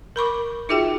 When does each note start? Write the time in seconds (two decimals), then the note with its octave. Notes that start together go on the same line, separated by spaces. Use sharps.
0.16 A#4 B5 C#6 D6
0.69 D#4 F4 F#4 G#4 E5 G5